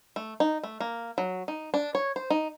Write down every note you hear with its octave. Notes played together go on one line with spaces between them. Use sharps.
A3
D#4
A3
A#3
F#3
D#4
D4
C#5
C5
D#4